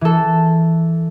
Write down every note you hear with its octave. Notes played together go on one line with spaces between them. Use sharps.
E3 A4